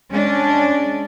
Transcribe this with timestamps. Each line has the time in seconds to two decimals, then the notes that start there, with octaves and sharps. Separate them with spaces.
0.10 G#3 C#4 D4